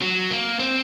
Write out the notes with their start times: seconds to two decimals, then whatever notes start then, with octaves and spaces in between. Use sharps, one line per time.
0.02 F#3
0.31 A#3
0.59 C4